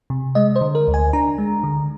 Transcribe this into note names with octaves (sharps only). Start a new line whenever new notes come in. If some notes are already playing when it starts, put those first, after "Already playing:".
C3
G#3 D#5
C5
D3
A#4
D2
G#5
D4 A#5
G#3
D3